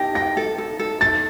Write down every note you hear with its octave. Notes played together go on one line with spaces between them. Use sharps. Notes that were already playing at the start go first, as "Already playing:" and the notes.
Already playing: G4 A#6
G5 A#6
A4
A4
A4
A4 A6